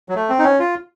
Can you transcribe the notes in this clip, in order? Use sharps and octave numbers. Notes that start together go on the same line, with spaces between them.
F#3
A3
C4
D#4
C#4
F4